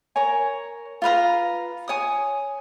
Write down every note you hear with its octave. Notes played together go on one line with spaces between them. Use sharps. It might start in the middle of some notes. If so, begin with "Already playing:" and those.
A#4 C#5 G#5
F4 B4 F5 A#5
C#5 G#5 D#6